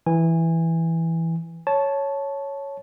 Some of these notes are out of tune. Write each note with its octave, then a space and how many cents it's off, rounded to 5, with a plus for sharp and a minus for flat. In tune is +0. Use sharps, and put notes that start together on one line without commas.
E3 +0 G#5 -20
C#5 +0 A5 -10